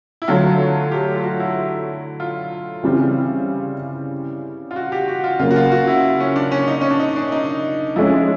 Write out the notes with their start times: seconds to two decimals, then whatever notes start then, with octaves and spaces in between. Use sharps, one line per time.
0.22 E4
0.28 D3 F#3 A3 F4
0.91 G4
1.15 F4
1.24 F#4
1.40 E4
2.20 F4
2.83 C#3 E3 G3 C4
4.71 F4
4.76 F#4
4.92 G4
5.08 F#4
5.24 F4
5.39 C#3 F#3 A#3 F4
5.51 F#4
5.56 F4
5.72 F#4
5.87 E4
6.20 C#4
6.36 D4
6.51 C#4
6.68 D#4
6.81 C#4
6.90 D4
7.00 D#4
7.16 D4
7.32 D#4
7.96 F3 G#3 C#4 E4